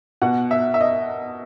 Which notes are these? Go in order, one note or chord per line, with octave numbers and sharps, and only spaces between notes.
B2 F#5
E5
E5
D#5